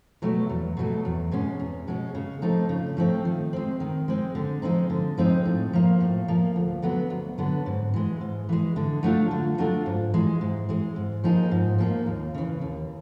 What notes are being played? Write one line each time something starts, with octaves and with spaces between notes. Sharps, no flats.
B2 F#3 A3
E2
B2 F#3 A3
E2
B2 G#3 C#4
E2
B2 G#3 C#4
C#3
F3 A3 C4 D#4
C#3
F3 A3 C4 D#4
D#3
G#3 C4
D#3
G#3 C4
D3
F3 G#3 C4 D#4
D3
F3 G#3 C4 D#4
A2
F3 A#3
A2
F3 A#3
D2
D3 F#3 B3
D2
D3 F#3 B3
G#2
E3 G#3
G#2
E3 G#3
D3
F#3 A3 D4 F4
D3
F#3 A3 D4 F4
G#2
E3 G#3
G#2
E3 G#3
G#2
F3 A#3 D#4 G#4
G#2
F3 A#3 D#4 G#4
D#2
C#3 E3
D#2